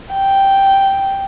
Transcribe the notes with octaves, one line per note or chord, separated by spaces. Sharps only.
G5